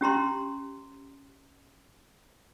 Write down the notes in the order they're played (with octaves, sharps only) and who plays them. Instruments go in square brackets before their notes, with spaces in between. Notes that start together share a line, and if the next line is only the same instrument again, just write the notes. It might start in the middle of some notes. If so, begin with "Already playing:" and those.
[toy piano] C#4 G4 A#5 C6